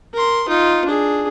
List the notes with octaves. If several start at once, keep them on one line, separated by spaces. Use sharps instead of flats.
A#4 C6
D#4 F4
D4 G#4